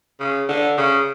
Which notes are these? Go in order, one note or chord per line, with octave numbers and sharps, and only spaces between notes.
C#3
D3
C#3